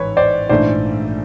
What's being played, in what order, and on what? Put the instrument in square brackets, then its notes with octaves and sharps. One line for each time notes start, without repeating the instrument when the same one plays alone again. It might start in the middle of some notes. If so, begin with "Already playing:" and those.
Already playing: [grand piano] A1 G#2 E3 [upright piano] B4 C#5
[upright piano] C5 D5
[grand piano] A#1 G#2 E3 A3 D4 [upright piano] C5 D5